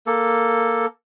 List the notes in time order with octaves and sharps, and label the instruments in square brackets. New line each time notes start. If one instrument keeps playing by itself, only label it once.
[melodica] A#3 A4